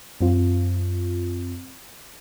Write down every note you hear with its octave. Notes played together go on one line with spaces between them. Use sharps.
F#2 C4 F4